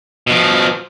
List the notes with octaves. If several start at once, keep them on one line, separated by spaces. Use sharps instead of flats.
B2 F3